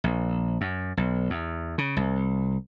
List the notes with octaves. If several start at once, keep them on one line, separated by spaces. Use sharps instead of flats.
A#1
F#2
B1
E2
C#3
C2